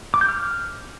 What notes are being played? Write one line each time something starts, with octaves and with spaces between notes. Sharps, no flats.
D6
G6
F6